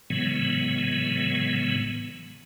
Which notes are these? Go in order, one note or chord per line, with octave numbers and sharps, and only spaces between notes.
A2 C#3 E3 F#3 G#3 B3